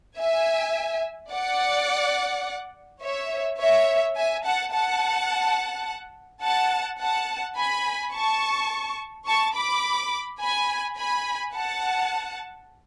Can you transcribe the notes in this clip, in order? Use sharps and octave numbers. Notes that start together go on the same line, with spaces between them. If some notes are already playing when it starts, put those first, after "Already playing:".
E5 G#5
D5 F#5
C#5 E5
C#5 E5
E5 G#5
F#5 A5
F#5 A5
F#5 A5
F#5 A5
G#5 B5
A5 C#6
A5 C#6
B5 D6
G#5 B5
G#5 B5
F#5 A5